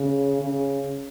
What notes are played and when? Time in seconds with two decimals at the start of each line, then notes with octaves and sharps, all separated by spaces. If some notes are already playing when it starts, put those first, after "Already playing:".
Already playing: C#3
0.41 C#3